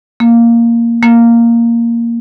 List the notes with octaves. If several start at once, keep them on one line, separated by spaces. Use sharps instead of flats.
A#3
A#3